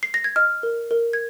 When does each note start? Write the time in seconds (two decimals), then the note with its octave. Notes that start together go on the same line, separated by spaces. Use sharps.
0.03 C7
0.14 A#6
0.24 G#6
0.36 D#5 F6
0.63 A#4
0.91 A#4
1.13 G#6